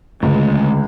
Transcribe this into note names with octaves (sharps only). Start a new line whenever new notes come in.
C#2 D3 G#3 A3 C#4